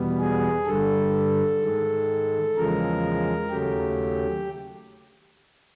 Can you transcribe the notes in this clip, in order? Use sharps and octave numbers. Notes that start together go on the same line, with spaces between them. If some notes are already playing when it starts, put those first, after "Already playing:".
Already playing: E2 B2 G3 B3
G#4
G2 D3 G3 A4
G#2 D#3 G#3
E2 C#3 F3 G#3 A#4
D#2 C#3 F#3 A3 G4